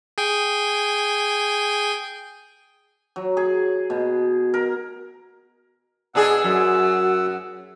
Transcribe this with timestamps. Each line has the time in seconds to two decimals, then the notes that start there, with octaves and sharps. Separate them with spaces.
0.18 G#4 G5 G#5
3.16 F#3
3.37 G#4
3.90 B2
4.54 A#4
6.15 B2 D4 G#4 F#5 E6
6.44 F#2 F#4